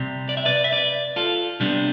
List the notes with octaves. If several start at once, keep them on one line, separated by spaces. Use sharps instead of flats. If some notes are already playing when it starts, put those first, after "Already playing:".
Already playing: C3 G3 C4
D5
E5
B4 D5
E5
B4 D5
F4 A4
C3 G3 B3 D4